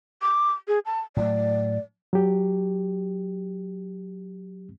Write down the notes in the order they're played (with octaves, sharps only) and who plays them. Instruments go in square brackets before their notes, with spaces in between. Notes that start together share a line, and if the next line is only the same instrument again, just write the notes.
[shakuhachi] D6
G#4
A5
[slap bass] A2 F#3 A3 [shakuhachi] D5
[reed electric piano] F#3 G4